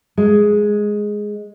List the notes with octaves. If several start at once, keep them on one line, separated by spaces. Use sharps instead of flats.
G#3